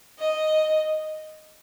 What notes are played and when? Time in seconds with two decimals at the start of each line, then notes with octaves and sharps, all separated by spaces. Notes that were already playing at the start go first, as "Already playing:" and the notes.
0.19 D#5